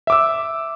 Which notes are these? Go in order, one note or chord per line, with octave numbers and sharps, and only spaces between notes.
E5 D6 E6